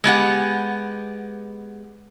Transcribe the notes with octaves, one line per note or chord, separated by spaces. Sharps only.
G#3 B3 G4 F#5